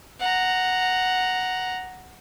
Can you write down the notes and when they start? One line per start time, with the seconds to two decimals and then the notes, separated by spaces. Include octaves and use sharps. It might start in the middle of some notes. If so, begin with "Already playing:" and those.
0.20 F#5 A#5